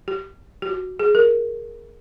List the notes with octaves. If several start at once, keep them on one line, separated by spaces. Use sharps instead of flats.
G4
G4
F#4
G#4
A#4